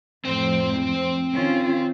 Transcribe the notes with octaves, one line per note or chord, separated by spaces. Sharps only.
F2 A2 F3 C4 C5
D#3 C#4 F4